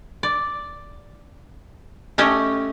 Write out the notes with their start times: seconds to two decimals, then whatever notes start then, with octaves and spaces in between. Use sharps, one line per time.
0.23 D5
2.18 A3 C#4 G4 D#5